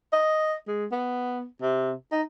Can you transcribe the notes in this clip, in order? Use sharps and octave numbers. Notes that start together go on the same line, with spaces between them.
D#5
G#3
B3
C3
D#4